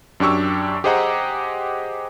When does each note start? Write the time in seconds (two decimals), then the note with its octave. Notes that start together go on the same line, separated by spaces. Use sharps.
0.20 F#2 D4 G4 C#6 E6
0.84 G4 G#4 C5 D#5 F#5 A#5